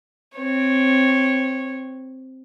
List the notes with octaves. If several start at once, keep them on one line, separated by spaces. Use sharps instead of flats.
C4 C#5